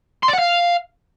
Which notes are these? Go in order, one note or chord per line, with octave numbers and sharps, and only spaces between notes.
C6
D5
F#5
F5